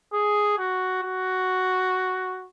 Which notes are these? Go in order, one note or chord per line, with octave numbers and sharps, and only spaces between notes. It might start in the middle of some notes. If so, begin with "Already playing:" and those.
G#4
F#4
F#4